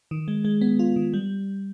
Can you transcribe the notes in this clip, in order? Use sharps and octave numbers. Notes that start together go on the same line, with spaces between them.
D#3
G#3
G#3
B3
F4
D#3
G3